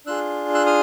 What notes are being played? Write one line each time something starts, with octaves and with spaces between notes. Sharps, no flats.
D4 F4 G#4 E6 F#6
E6 F#6
D#6 F6